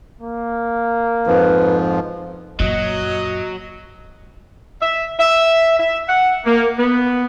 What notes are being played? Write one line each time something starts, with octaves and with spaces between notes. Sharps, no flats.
A#3
F2 G#2 F3 B4
F#2 A#2 F#3 D#5
E5
E5
E5
F#5
A#3
B3